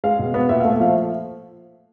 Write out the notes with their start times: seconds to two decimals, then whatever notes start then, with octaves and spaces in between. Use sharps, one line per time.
0.04 G#3 F5
0.19 B2
0.34 B3
0.49 A#2 E5
0.60 A3 F5
0.71 E5
0.80 F3 F5